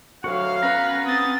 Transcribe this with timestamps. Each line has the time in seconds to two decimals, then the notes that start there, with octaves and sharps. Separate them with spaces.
0.24 D2 F#3 F#4 F5
0.62 B3 C#4 B4 A#5
1.05 C4 D#6 A6